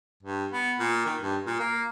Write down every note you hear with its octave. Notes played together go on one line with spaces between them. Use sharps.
G2
B3
A#2
D#3
G2
A#2
A#3